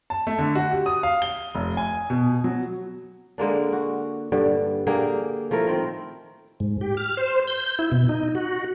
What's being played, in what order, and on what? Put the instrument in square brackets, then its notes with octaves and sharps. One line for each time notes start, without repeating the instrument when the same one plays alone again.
[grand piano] A5
A3
D3
F#4
G4
D#6
F5
G7
F1
G#5
B2
F#3
[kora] D3 G#3 A#3 D4
F#4
G2 D3 G3
D3 A#3 G4 G#4
F3 A3 E4 A#4
D#3 C4
[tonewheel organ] G#2
G4
F6
C5
G6
G6
E4
B2
D#4
F#4